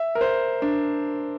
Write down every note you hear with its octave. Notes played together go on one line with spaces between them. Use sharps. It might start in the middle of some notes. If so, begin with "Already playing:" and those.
Already playing: E5
A#4
C5
D4